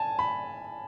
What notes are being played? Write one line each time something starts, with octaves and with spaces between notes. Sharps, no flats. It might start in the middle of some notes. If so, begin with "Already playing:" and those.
Already playing: G#5 A5
B5